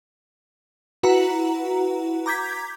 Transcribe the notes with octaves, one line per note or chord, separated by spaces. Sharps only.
E4 F#4 B4 F#5 A#5
A#5 D6 G6 G#6 B6